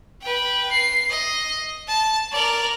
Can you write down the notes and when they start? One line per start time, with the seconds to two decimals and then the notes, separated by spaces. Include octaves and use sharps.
0.22 B4 G5
0.71 C7
1.10 D#5
1.88 A5
2.32 A#4 D5